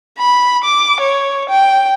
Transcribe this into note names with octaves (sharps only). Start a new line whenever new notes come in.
B5
D6
C#5
G5